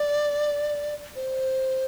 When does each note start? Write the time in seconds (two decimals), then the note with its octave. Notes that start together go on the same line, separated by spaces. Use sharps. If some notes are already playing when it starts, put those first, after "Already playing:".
Already playing: D5
1.16 C5